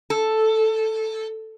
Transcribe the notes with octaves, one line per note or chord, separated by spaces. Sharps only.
A4